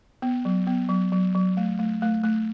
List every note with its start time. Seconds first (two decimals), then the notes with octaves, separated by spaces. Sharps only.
0.22 B3
0.45 F#3
0.67 B3
0.89 F#3
1.12 F#3
1.35 F#3
1.57 A3
1.79 A3
2.02 A3
2.24 A3